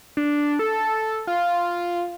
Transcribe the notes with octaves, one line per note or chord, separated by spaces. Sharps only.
D4
A4
F4